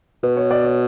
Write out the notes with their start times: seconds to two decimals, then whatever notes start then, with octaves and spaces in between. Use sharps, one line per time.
0.23 B2 B4
0.37 C#5
0.51 D5
0.64 C#5